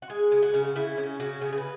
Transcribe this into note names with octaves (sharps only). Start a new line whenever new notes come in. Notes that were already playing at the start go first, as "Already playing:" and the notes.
F#4
G#3 G#4
C#3
F#4
C#3
C#3 E4
C#3 C#4
C#3 F#4
C#3 G#4
G#4
B4